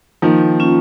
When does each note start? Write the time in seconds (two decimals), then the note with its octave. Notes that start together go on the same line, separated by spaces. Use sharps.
0.22 D#3 F3 A#3
0.60 C#4 F4